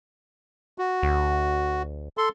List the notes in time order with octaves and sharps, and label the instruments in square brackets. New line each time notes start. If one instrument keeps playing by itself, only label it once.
[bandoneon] F#4
[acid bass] D2
[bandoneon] A4 C6